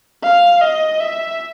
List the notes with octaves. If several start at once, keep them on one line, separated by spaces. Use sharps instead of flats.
F5
D#5
E5